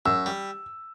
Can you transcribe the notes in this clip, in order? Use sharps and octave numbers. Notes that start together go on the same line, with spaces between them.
F#2 E6
G3